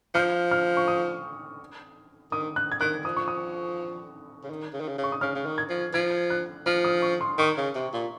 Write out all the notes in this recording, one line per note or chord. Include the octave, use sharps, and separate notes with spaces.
F3 F6
F6
C#6
D#6
D#3 D#6
F#6
G#6
D#3 F#6
F3 D#6
C#6
D#6
C#3
D#3
C#3
D#3
C#3
C#3
C#6
D#6
C#3 F6
C#3
D#3
G#6
F3
F3 G#6
F#6
F3 F6
D#6
C#6
C6
D#3 C#6
C#3
C3
A#2